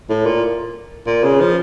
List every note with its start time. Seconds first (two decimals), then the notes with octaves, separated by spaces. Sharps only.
0.09 A2
0.26 A#2
1.07 A#2
1.23 C#3
1.40 F3